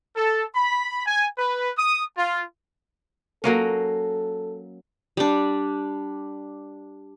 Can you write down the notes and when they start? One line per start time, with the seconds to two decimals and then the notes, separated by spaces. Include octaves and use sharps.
0.16 A4
0.55 B5
1.06 G#5
1.38 B4
1.78 D#6
2.18 F4
3.44 F#3 A#3 C#4 A4
5.17 G3 D4